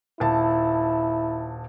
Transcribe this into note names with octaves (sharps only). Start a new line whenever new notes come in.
D#1 E4 A5